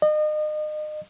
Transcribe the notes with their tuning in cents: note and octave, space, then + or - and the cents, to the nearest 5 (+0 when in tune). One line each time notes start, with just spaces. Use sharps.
D#5 -35